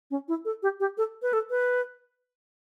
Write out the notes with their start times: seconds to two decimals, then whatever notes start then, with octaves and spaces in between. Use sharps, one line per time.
0.11 C#4
0.28 E4
0.45 A4
0.63 G4
0.80 G4
0.98 A4
1.22 B4
1.33 A4
1.50 B4